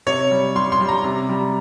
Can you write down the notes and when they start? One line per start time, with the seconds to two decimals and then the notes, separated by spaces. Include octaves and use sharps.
0.07 C3 C#5
0.31 G3
0.55 G3 C6
0.72 C6
0.80 G3
0.89 A#5
1.04 C3
1.29 G3